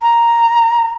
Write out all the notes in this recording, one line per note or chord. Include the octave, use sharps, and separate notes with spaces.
A#5